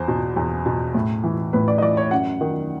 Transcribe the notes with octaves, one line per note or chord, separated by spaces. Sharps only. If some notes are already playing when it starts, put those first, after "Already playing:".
Already playing: E2 C5
B2
E2
B2
A2
E3
A2 B4
D5
D#5
E3 D5
C#5
F#2 F#5
D#3